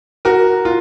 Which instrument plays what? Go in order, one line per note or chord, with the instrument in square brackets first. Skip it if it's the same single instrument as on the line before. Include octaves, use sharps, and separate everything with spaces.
[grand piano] F#4 A#4
F4